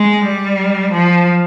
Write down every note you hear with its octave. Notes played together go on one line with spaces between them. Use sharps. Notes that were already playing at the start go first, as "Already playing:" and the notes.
Already playing: G#3
G3
F3